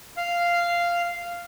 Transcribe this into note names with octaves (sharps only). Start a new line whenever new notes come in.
F5